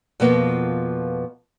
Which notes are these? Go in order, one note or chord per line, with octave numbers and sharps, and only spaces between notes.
F2 B2 F3 A#3 B3